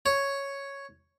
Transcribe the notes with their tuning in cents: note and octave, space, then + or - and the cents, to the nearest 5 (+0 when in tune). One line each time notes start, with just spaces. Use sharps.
C#5 +0